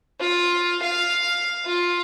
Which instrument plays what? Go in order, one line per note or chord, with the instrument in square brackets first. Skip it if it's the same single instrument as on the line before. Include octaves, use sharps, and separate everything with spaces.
[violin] F4
F5
F4